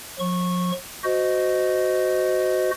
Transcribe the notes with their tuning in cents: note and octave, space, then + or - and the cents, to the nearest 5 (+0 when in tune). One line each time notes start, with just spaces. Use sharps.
F3 +40 C#6 -15
F#4 +0 C5 -25 D#5 +0